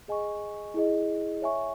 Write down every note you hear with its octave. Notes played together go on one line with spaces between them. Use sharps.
G#4 D#5 G#5 C#6
E4 G#4 D#5
C#5 E5 G#5 C#6